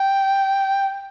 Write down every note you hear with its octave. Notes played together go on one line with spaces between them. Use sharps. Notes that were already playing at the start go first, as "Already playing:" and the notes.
Already playing: G5